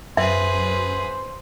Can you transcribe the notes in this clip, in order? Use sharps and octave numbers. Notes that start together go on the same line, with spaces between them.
F#2 G#4 B4 C5 E5